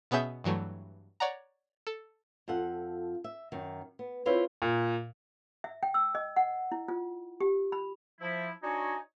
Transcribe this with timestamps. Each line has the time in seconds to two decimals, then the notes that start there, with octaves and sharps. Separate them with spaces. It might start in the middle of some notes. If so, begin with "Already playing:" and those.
0.11 B2 B3 C#4 G#4 E5 G6
0.44 G2 E3 F#3 A3
1.20 C#5 D5 F#5 A#5
1.87 A4
2.48 F2 F4 A4 F#5
3.24 E5
3.52 F#2 D#3
3.99 B3
4.26 C4 E4 F4 B4 C#5
4.62 A#2
5.64 E5
5.83 G5
5.94 E6
6.15 D#5
6.36 F#5
6.72 E4
6.88 F4
7.40 G4
7.72 B5
8.21 F3 E4
8.63 D4 D#4 F#4 C#5 D#5 G#5